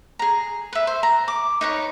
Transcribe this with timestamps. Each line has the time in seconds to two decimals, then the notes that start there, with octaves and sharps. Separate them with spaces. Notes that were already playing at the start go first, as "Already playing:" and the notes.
0.19 G#4 A#5
0.73 B4 E5
0.87 C5
1.03 A#5
1.28 D6
1.61 D#4 B4 C#5